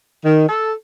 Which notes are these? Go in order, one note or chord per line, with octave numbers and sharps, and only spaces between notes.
D#3
A4